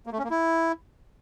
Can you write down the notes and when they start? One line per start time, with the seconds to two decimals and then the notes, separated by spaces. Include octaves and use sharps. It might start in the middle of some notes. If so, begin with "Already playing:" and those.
0.07 A#3
0.12 A3
0.18 C#4
0.24 A#3
0.30 E4